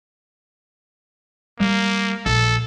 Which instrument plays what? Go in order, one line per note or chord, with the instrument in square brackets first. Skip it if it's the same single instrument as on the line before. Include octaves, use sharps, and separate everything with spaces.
[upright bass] G3 [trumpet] A#3
[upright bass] A#1 [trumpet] A4